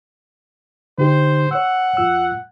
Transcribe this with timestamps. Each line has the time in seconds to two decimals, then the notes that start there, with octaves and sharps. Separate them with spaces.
0.98 D3 D#4 G4 C5
1.51 C#5 F#5 E6
1.97 F2 F4 E6